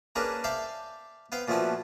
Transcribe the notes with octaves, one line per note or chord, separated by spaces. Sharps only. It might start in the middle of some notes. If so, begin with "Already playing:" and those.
A#3 C#4 D4 G#4 A#4 B4
C5 D5 E5 F5 G5 A5
B3 C5 F5 G5
A#2 F3 A3 B3 C#4 F#4